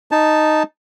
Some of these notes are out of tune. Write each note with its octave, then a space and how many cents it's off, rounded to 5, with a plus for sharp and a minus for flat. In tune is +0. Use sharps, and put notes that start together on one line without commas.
D#4 -5 A5 +0